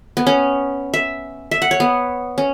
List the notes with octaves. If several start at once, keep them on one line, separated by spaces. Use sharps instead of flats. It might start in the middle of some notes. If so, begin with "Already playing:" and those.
B3
C#4
E5
E5
F#5
C#5
B3
C#4